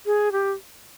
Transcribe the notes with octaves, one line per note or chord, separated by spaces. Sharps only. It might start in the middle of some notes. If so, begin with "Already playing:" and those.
G#4
G4